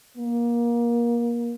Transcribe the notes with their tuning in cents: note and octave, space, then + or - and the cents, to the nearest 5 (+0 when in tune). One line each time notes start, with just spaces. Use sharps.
A#3 +25